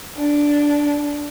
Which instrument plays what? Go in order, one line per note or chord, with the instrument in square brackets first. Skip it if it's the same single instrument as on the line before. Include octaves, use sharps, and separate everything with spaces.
[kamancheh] D4